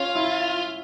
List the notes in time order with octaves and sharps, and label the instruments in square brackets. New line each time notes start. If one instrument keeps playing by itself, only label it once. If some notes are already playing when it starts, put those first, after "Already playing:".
Already playing: [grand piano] C#4 [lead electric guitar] F4
[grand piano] E4